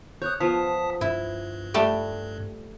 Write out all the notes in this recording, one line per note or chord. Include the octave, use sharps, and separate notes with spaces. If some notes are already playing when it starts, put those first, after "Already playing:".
C#5 D#6 F#6 G6
F3 B3 F5 A5 D#6 B6
G2 E4
G3 A3 G4